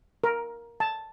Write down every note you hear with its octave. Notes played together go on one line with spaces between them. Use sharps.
A#4
A5